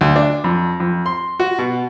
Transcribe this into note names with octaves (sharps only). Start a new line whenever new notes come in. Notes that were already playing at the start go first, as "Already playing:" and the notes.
D2
D4
F2
F2
C6
F#4
B2